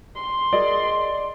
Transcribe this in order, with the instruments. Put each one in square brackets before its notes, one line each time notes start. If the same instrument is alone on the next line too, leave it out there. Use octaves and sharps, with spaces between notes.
[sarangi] C6
[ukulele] G#4 A#4 D#5 [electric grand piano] D5